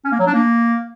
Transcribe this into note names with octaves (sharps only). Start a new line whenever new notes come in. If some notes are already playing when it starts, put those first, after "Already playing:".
C#4
A#3
F#3
D4
A#3